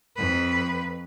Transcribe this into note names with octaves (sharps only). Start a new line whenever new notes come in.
F2 B4